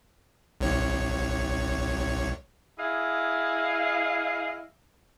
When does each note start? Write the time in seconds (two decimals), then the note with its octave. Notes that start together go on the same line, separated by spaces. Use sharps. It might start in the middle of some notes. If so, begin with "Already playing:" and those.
0.61 C2 C#5
2.78 E4 G#4 D#5 F5